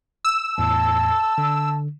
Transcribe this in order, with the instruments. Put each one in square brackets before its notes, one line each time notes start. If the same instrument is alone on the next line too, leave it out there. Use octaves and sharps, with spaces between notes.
[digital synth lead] E6
[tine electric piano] E2 A2 [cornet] A5
[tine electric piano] D3